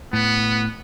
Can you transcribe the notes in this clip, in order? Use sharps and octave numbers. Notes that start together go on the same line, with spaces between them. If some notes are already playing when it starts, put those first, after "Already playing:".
A2 B3